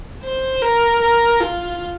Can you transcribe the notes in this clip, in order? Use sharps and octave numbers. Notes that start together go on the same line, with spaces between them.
C5
A#4
A#4
F4